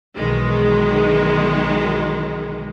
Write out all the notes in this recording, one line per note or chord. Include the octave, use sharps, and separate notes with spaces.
B1 D#3 E3 G#3